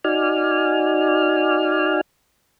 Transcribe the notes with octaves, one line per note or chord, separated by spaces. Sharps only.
D#4 F#4 D5 G#5 F6